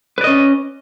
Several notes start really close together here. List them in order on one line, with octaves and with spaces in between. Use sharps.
B4 D5 D#5 C#4